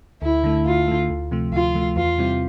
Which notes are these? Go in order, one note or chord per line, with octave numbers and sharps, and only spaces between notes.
D2 E4
D3 A3
D2 F4
D3 A3
D2
C3 F3 A3
D2 F4
C3 F3 A3
E2 F4
C3 G3 C4 E4